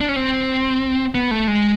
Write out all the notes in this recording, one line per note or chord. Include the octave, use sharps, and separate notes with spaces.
D4
C#4
C4
B3
A3
G#3